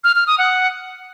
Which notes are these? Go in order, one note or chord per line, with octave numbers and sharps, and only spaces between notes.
F6
F6
D#6
F#5